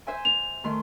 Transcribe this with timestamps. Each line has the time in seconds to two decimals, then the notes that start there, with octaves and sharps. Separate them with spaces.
0.07 C5 E5 G#5
0.25 F7
0.64 D#3 A3 C6